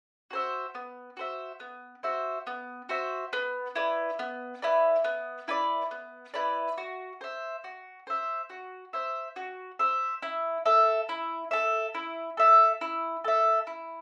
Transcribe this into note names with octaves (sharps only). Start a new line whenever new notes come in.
F#4 C5 E5
B3
F#4 C5 E5
B3
F#4 C5 E5
B3
F#4 C5 E5
B3
E4 B4 D5
B3
E4 B4 D5
B3
E4 B4 D5
B3
E4 B4 D5
F#4
C5 E5
F#4
C5 E5
F#4
C5 E5
F#4
C5 E5
E4
A4 E5
E4
A4 E5
E4
A4 E5
E4
A4 E5
E4